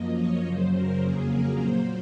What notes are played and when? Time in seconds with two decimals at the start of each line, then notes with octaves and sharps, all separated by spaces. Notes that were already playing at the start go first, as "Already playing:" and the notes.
Already playing: F#2 F3 A#3 D#5
0.18 C#5
0.46 F#2 C#3 F#3 C5
0.74 A#4
1.02 F2 C#3 F#3 A#3 G#4
1.31 A#4
1.59 A#2 F#3 A#3 C5